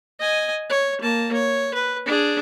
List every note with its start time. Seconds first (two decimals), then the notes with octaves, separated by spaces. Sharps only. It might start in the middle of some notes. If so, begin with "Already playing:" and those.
0.19 D#5 G#5
0.70 C#5
1.01 A#3 A5
1.33 C#5
1.74 B4
2.06 D4 G#4